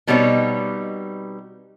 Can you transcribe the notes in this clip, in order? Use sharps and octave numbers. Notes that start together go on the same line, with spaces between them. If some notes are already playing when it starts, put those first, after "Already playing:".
B2 G3 B3 C4 D#4 C#5